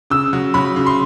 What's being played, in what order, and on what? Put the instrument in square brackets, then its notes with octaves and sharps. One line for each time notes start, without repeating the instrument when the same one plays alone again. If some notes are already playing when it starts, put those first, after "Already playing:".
[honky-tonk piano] C#3 E6
F#3
F#3 B5
C#3
C6